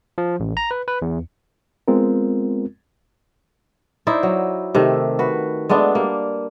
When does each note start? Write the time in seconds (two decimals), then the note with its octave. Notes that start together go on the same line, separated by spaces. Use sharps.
0.18 F3
0.40 A1
0.57 A#5
0.71 B4
0.88 B4
1.02 E2
1.88 G#3 B3 C4 F4 A#4
4.07 D#4 E4 C5 D5
4.23 F#3
4.75 C3 D#3 A3
5.19 F#4 B4
5.69 G#3 A3 B3 D4
5.95 G3 A#3